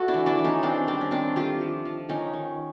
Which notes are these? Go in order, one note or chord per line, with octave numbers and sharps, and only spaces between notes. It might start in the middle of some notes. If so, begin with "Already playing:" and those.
Already playing: A3 F#4
D4 E4
E3
D4 E4
E3
C#4 D#4
D#3 C4 D4
G3 C4 D4
C#4
D#3 C4 D4
A3 F4 G4
F3
F3
D#3 C#4 D#4
D#3